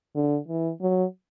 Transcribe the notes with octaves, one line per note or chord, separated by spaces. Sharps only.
D3
E3
F#3